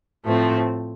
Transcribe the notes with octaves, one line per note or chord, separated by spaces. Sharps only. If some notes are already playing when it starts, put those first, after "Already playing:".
A2 F3 A3 C4